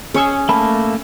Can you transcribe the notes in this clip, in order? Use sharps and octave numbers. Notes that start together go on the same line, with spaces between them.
C#4 G#4 C#6 E6
A3 A#3 A5 B5